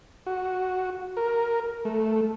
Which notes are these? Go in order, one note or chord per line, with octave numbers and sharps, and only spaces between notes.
F#4
A#4
A3